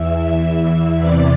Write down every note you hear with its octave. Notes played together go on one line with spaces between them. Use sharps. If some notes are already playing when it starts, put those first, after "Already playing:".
Already playing: E2 E3 E5
E2 C3 E3 D5